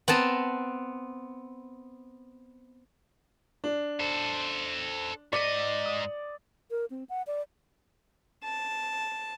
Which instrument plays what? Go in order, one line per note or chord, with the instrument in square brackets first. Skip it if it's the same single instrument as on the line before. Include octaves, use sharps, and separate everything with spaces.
[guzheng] B3 C4 A5 A#5
[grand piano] D4
[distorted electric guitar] A4 C5
[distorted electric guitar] G#2 D#5 [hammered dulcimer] D5 [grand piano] B6 C#7
[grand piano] D#6
[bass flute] A#4
C4
F#5
D5
[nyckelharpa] A5